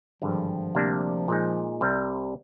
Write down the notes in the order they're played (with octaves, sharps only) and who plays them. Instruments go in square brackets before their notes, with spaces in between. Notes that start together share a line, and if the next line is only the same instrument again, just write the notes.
[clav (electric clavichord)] G#1 G2 D3 [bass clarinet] F3
[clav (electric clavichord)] D2 C3 G3 A#3 D4
A#2 G#3 D#4
C2 C3 G3